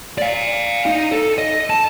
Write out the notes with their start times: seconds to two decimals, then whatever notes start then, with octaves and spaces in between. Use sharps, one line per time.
0.18 D5 F5
0.86 D#4 D#5
1.12 A4
1.38 D#5
1.70 A5